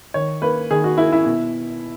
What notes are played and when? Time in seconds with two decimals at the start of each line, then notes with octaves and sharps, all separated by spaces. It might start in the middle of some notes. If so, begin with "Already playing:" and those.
0.14 D#3 C#5
0.42 A#3 B4
0.71 D#3 G#4
0.84 F#4
0.98 A#3 E4
1.12 E4
1.26 B2